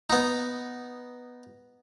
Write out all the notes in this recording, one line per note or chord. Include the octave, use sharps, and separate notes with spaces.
B3 D#4